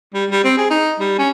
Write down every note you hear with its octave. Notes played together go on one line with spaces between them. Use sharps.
G3
G3
C4
G#4
D#4
G3
C#4